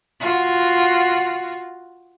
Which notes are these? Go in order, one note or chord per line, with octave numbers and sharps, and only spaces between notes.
F4 F#4